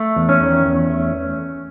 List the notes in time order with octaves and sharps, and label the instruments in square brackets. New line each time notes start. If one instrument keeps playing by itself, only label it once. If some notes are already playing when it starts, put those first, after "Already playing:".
Already playing: [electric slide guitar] A3
E2
C#4
D#3
E2
A3